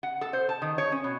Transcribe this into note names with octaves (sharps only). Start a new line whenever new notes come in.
F#5
A4
C5
A5
D#3
C#5
C#4
B2